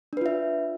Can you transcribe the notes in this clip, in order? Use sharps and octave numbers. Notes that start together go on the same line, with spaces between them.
D4 F4 B4 E5